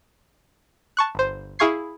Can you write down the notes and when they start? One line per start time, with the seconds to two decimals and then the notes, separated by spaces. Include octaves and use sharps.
0.97 A5 C#6 F#6
1.15 G1 C5
1.59 E4 G#4 F5 C#6 G#6 C7